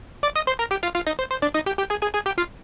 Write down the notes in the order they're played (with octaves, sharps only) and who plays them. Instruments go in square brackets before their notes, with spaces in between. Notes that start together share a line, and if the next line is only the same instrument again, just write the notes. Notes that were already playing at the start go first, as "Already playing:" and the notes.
[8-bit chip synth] D5 D6
D#5 D#6
C5 C6
A#4 A#5
G4 G5
F4 F5
F4 F5
D#4 D#5
C5
C5
D4 D5
D#4 D#5
G4 G5
G4 G5
G#4 G#5
G#4 G#5
G#4 G#5
G4 G5
F4 F5